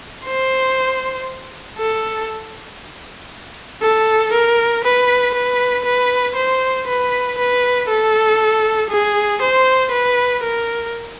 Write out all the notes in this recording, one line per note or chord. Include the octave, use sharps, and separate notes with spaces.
C5
A4
A4
A#4
B4
B4
B4
C5
B4
B4
A4
G#4
C5
B4
A#4